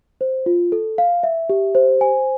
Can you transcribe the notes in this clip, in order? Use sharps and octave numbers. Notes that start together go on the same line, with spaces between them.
C5
F4
A4
F5
E5
G4
C5
G#5